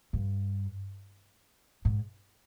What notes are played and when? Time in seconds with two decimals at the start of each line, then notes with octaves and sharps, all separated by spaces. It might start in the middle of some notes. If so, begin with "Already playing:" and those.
0.13 G2
1.85 G#2